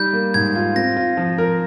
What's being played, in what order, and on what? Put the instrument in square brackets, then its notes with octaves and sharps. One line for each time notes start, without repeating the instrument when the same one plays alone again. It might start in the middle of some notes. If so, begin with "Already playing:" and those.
Already playing: [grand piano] G3 D#4 [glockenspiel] G6
[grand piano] A#3
[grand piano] G#2 [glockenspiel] G#6
[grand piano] F4
[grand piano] C4 [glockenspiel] A#6
[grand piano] F4
F3
A#4